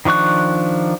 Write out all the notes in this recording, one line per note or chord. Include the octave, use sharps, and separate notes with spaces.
D#3 F3 D4 C#6 F#6